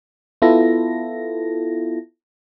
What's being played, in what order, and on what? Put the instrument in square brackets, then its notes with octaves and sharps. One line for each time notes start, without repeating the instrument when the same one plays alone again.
[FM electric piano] B3 E4 F4 A4 A#6